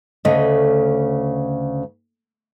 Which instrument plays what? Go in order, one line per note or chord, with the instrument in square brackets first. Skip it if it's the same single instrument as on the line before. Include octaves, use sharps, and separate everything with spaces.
[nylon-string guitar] D2 C#3 A3 D#5